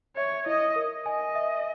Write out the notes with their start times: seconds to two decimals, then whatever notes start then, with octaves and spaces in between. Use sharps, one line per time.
0.16 C#5 E5
0.46 E4 D#5
0.76 A#4
1.05 D#5 G#5
1.35 E5